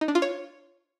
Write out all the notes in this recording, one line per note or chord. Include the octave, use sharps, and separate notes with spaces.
D#4
D4
F4
C#5